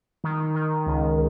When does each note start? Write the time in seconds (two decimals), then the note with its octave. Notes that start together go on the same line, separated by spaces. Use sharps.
0.24 D#3
0.55 D#3
0.86 C#2